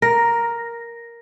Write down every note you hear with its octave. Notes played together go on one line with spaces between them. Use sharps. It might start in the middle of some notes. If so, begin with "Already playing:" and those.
A#4 A#6